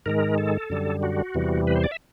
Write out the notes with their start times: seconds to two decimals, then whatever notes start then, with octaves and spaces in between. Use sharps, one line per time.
0.06 G#2 D#3 G#3 A#4
0.38 A4
0.70 F#2 D3 G3
1.03 F#4
1.34 E2 C3 E3 G3
1.67 B4
1.76 C5
1.84 D5
1.92 E5